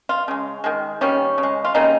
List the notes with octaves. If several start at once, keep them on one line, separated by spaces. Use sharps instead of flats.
F4
C#3 G#3
D#3 G#3
D#3 G3 A#3 C#4
C#3
G#3
F4
C#3 G3 A#3 D#4